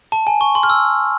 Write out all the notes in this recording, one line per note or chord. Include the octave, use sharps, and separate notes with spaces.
A5
G#5
C#6
C6
F6
E6